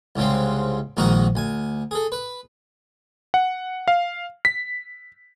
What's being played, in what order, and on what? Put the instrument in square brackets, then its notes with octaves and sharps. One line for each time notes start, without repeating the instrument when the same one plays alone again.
[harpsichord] C2 G#2 C#3 G#3 C4
A#1 G#2 D#3 D#4 F#4 A#5
D2 G#5
G#4 A4
B4
[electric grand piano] F#5
F5
B6